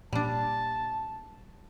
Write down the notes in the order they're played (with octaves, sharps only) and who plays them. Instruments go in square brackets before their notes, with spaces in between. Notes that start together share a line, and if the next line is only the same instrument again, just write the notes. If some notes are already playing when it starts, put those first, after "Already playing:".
[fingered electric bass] A#2 [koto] G3 D4 [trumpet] A5